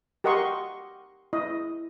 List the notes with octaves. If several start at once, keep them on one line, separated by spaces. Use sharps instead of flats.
G4 A#4 D#5 F#5 C6 C#6
E4 D#5